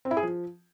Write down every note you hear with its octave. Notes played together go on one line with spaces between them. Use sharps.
C4
E4
G#4
F3